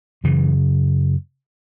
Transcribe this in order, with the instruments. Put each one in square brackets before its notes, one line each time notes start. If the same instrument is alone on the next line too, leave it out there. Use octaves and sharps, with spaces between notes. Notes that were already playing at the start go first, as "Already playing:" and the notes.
[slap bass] F#2 C#3 E3